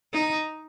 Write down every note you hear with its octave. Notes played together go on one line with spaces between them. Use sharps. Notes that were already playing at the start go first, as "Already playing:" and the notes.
D#4